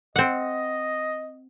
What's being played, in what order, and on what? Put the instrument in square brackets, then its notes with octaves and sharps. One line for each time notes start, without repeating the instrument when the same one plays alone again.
[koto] C4 F#5 [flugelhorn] D#5